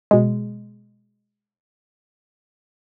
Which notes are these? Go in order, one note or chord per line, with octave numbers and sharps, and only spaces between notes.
B2 G#3